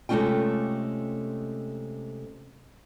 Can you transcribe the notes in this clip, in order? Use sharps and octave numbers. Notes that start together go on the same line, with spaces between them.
C3 G#3 A3 C#4 F4 G5